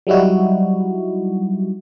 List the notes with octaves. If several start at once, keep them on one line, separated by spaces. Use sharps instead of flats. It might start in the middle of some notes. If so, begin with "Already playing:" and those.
F#3 G3 D#4 E4 F#4